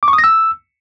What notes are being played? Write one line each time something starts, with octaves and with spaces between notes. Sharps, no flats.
D6
C#6
D#6
A#6
E6